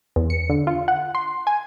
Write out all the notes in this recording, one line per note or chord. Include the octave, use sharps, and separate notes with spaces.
E2
C#7
D3
F4
F#5
C6
G#5